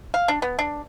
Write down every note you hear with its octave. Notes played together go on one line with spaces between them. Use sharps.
F5
D4
B3
D4